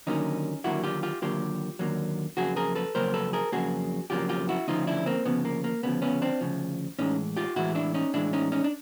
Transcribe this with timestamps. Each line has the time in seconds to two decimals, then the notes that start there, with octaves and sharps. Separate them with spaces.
0.07 D#2 D3 F#3 A#3 C#4 D#4
0.64 D#2 D3 F#3 A#3 E4 F#4
0.84 F4 G4
1.03 F4 G4
1.22 D#2 D3 F#3 A#3 F4 G4
1.79 D#2 D3 F#3 A#3
2.37 F2 C#3 F#3 A#3 F#4 G#4
2.56 G#4 A#4
2.75 A4 B4
2.95 F2 C#3 F#3 A#3 A#4 C5
3.14 A4 B4
3.33 G#4 A#4
3.52 F2 C#3 F#3 A#3 F#4 G#4
4.10 F2 C#3 F#3 A#3 F4 G4
4.29 F4 G4
4.49 E4 F#4
4.68 D2 C#3 F3 D#4 F4
4.87 D4 E4
5.06 A#3 C4
5.25 D2 C#3 F3 B3
5.45 A#3
5.64 A#3
5.83 D2 C#3 F3 B3
6.02 B3 C#4
6.22 C4 D4
6.41 D2 C#3 F3
6.99 A2 E3 G#3 C#4 D#4
7.36 F4 G4
7.56 A2 E3 G#3 E4 F#4
7.75 D4 E4
7.94 C#4 D#4
8.13 A2 E3 G#3 D4 E4
8.33 C#4 D#4
8.52 C#4 D#4
8.64 D4